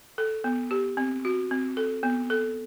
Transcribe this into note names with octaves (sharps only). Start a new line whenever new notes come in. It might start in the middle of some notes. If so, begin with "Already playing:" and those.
A4
B3
G4
C4
F#4
C4
A4
B3
A4